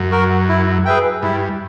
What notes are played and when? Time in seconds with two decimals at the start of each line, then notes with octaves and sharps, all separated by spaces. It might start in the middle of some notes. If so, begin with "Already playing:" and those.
Already playing: F#2
0.11 F#4 A#4
0.49 E4
0.85 G#4 B4 E5 G5
1.23 G2 E4